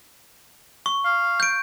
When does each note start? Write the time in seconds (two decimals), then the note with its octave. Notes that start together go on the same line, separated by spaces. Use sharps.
0.86 C#6
1.05 F5
1.40 G6 D7